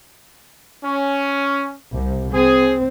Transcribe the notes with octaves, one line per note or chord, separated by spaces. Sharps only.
C#4
C2 C3
C4 G#4